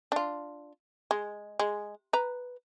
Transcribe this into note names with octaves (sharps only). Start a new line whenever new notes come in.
D4 F4
G#3
G#3
B4 A#5